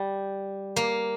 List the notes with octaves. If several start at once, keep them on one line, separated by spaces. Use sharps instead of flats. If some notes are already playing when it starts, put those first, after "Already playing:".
Already playing: G3
A#3